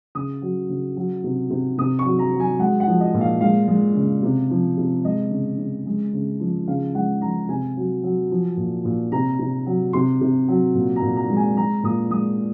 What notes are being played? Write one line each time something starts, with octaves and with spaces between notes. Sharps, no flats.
C#3 D#6
F#3
C#3
F#3
C3
C3
C3 D#6
C#6
F#3
A#5
F#3
G#5
G#3 F#5
F#5
F3
D#5
A#2
F5
G#3 F5
G#3
C#3
C3
F3
C3
G#3 D#5
C#3
C#3
G#3
C#3
F3
C#3 F5
G#3 F#5
F3 A#5
C3 G#5
F#3
F#3
F3
A#2
A#2
C3 A#5
C3
F#3
C3 C6
C3
F#3
A#2
A#5
A#2
A#5
G#3
G#5
G#3 A#5
A#2 D#6
G#3 D#6